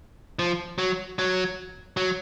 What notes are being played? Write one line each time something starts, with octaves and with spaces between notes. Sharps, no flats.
F3
F#3
F#3
F#3